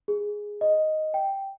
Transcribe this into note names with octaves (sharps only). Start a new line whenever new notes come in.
G#4
D#5
G5